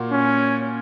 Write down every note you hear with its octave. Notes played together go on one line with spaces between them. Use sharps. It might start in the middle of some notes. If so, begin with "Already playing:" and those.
Already playing: A#2 A#3 F#4
C#4